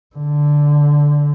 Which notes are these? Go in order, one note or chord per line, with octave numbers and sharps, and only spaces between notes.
D3